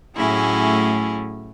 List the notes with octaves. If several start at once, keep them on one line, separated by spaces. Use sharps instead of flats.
A2 F#3 A3 C#4 E4 G#4